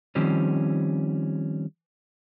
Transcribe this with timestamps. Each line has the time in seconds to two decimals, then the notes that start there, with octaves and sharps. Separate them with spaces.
0.15 D#3 F3 G3 C4 C#4